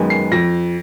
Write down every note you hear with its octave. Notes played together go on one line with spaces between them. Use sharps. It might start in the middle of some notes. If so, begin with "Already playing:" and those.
Already playing: F#2 D#3 G#3 B3
C7
F2 A#6